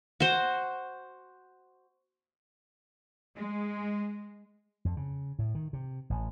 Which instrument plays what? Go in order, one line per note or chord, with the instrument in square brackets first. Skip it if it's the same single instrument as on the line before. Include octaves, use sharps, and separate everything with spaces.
[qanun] F#4 C5
[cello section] G#3
[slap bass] F2
C#3
A2
D#3
C3
A1